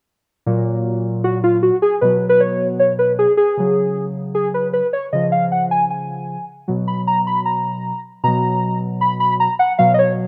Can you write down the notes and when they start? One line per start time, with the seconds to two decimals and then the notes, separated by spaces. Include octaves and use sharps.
0.46 A#2 F#3
1.24 F#4
1.44 F4
1.63 F#4
1.82 G#4
2.01 B2 F#3 B4
2.29 B4
2.40 C#5
2.79 C#5
2.99 B4
3.19 G#4
3.37 G#4
3.57 C#3 F#3
4.35 G#4
4.54 B4
4.73 B4
4.93 C#5
5.13 C#3 F3 D#5
5.32 F5
5.52 F#5
5.71 G#5
5.90 G#5
6.68 B2 F#3
6.88 B5
7.07 A#5
7.27 B5
7.46 A#5
8.24 B2 F#3 A#5
9.01 B5
9.20 B5
9.40 A#5
9.59 F#5
9.79 B2 F#3 F5
9.94 D#5
9.99 C#5